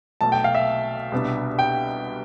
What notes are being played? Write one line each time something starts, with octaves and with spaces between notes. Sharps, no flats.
B1 B2 A3 A5
G5
F5
E5
C2 B2 B3 D4
G5